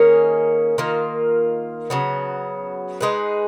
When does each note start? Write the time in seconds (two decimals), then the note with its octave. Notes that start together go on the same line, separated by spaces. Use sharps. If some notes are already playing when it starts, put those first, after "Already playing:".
Already playing: D#3 A#3 C#4 G#4
0.78 D#3 A#3 F4
1.90 C#3 F#3 B3
3.01 G#3 D#4 G#4 B4